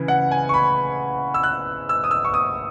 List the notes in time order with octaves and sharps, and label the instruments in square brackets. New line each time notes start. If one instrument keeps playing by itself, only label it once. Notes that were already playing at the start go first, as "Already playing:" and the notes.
Already playing: [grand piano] C#3 E3
F#5
G#5
C#6
B5
E6
F#6
E6
D#6
E6
C#6
D#6